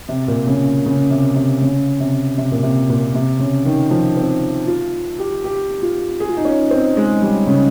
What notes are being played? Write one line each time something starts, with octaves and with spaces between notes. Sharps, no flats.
C3
A#2
C#3
C#3
C3
C3
C#3
C3
C3
A#2
C3
A#2
C3
C#3
D#3
F3
C4
F4
G4
G4
F4
G#4
F4
D#4
C#4
C4
G#3
G3
C#3